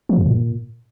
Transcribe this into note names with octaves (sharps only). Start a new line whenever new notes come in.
F3
F#2
A#2